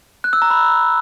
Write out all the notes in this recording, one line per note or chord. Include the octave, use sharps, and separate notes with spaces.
F#6
E6
A#5
B5